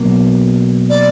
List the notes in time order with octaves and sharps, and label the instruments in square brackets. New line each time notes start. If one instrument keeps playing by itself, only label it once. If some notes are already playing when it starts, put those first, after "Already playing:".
Already playing: [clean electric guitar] B2 F#3 A#3
[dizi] D5